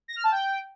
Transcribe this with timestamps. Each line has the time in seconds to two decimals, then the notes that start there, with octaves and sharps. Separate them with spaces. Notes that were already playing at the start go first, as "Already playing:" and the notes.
0.08 A#6
0.16 F6
0.24 A5
0.32 G5